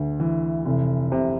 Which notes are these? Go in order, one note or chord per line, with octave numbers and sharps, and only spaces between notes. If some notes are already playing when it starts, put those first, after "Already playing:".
Already playing: D2
E3
F1
C3